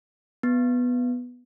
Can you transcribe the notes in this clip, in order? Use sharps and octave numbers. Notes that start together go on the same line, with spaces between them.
B3